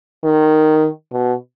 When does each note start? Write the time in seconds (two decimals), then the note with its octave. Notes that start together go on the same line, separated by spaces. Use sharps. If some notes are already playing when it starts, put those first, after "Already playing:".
0.24 D#3
1.12 B2